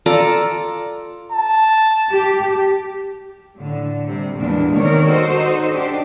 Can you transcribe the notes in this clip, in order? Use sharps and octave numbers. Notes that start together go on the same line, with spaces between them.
F4 A4 D5 A#5
A5
G4
A2 D3
C3 G3
E2 A#2 G#3 D4
C3 D#3 A#4 C#5 D5
D#4 F#4 A4 C5 D#5
D4 G4